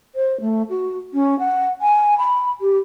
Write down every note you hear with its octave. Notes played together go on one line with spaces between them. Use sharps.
C5
A3
F#4
C#4
F#5
G#5
B5
G4